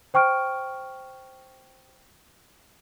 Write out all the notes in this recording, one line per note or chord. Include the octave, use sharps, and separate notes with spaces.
C5 G5 C#6 F6 D7